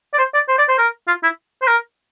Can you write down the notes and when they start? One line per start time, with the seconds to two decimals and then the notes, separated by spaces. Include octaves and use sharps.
0.14 D5
0.18 C5
0.34 D5
0.48 C5
0.58 D5
0.68 C5
0.78 A#4
1.08 F4
1.23 E4
1.62 C5
1.68 A#4